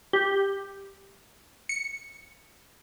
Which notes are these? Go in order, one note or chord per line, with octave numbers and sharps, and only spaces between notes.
G4
C#7